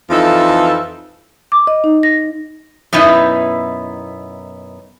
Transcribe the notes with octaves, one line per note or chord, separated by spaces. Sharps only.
F2 E3 D#4 A4 E5 F5
D6
D#5
D#4
A#6
F#2 B2 B3 D#4 E4